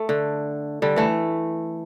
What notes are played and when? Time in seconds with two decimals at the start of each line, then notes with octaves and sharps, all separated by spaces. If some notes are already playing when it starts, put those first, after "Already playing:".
Already playing: A3
0.09 D3
0.82 D3 G3
0.96 E3 A3